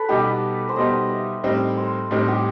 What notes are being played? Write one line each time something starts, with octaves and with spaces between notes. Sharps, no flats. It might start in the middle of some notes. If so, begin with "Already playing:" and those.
Already playing: A4 B4
B2 G3 B3 D#4 G4
C5
B2 G3 B3 D#4 D#5
E5
A2 G3 C4 D#4 D#5
C5
A2 G3 C4 D#4 D#5
G4